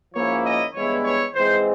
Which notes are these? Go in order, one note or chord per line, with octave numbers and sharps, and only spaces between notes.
G#2 F3 A#3 C#4 E4 C#5
D#5
G2 E3 G#3 B3 E4 C#5
C#5
G#2 E3 G#3 C4 C5